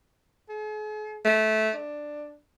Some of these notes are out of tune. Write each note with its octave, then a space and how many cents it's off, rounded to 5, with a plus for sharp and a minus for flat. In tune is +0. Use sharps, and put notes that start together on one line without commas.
G#4 +45
A3 -15
D4 +10